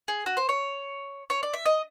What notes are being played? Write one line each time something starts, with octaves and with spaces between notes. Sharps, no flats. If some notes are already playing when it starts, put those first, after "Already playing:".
G#4
F#4
C5
C#5
C#5
D5
E5
D#5